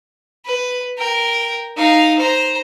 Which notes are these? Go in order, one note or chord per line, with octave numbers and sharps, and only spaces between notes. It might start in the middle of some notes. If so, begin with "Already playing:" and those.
B4
A#4 G5
D#4 F5
C5 A#5